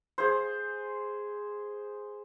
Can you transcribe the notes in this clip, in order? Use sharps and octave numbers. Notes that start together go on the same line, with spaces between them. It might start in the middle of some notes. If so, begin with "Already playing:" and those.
G#4 C5